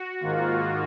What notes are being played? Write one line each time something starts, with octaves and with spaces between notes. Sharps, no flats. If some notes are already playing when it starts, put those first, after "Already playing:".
Already playing: F#4
G#2 D#3 A#3 F4